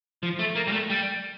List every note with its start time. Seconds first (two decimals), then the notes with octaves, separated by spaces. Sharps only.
0.23 F3
0.39 A3
0.56 A#3
0.68 G3
0.73 A3
0.90 G3